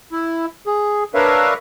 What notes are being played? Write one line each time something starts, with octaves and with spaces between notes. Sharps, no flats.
E4
G#4
D4 A#4 B4 C#5 E5 F5